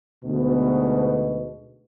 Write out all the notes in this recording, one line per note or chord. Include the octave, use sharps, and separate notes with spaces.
D2 G#2 B2